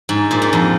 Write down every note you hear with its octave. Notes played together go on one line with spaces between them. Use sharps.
G#2
A#2
G#2
F2